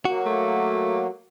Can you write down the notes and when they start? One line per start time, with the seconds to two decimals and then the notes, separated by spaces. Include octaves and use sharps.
0.05 F#3 A#3 F#4
0.26 A3